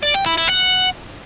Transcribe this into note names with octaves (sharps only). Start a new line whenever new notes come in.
D5
G5
E4
E4
F#5